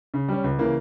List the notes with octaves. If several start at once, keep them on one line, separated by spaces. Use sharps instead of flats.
C#3
G3 C#4
C#2
C#3 E3 A#3